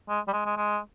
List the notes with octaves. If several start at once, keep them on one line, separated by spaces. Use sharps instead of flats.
G#3
G3
G#3
G#3
G#3